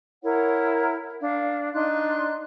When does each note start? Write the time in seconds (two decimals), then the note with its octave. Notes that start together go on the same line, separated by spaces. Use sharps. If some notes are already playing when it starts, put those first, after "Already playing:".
0.23 E4 A#4 C#5 F#5
1.21 D4 F5
1.73 D4 D#4 C6 F#6